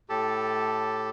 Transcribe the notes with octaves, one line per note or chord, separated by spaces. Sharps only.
A2 G4 A4 A5